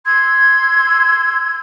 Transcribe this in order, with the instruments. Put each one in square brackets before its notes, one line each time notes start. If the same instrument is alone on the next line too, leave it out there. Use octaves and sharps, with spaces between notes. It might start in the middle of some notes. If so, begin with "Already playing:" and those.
[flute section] C6 E6 G#6